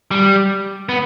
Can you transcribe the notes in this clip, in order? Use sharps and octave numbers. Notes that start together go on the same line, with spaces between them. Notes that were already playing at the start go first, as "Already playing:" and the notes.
G3
B3